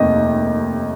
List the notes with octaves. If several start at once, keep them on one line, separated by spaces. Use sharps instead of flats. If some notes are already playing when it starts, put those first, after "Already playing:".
Already playing: F1 D#2 D#5